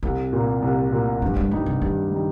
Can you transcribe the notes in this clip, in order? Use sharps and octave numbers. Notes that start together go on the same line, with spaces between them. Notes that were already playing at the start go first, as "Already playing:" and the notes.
C2 C3
A#2 A#3
C2
A#2 A#3
G2 F3
G3
F3 G3 D#4
C3
G2 D#3
G3 D#4